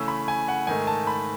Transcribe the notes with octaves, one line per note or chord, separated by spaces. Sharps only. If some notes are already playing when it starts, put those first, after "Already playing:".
Already playing: C#3 E3 A3 C#4 E6
B5
G#5
F#5
G#2 D#3 A3 G#5
A5
B5